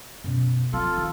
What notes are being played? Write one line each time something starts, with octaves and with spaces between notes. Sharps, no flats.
F#2 B2
F3 C4 F4 A4
D#3